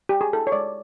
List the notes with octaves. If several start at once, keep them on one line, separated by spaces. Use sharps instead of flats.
G4
G#4
E4 A4
C#5
G#3 D5